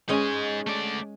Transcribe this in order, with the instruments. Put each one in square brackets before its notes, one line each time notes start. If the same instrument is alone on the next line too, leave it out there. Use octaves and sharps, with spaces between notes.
[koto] G#3 C#4 [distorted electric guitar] D#4 G#5
[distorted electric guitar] A3 D5